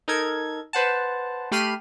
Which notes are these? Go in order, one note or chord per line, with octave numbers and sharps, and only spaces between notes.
D#4 A4 A#4 G#6
B4 C5 F#5 A5
A3 G4 B5 F6 C7 D#7